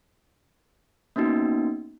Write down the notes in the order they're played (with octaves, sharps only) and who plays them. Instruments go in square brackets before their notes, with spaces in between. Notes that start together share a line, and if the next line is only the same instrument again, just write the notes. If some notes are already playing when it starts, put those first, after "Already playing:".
[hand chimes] A#3 B3 C#4 D#4 F#4